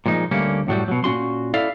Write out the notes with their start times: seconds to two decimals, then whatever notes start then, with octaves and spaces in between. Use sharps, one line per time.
0.06 A#2 F3 G#3 D#4
0.31 D2 G3 A3 A#3 C#4
0.67 F#2 A2 F#3 G3
0.88 B2 F#3
1.04 A#2 C#4 F#4 C6
1.54 E4 A4 D5 E5 F5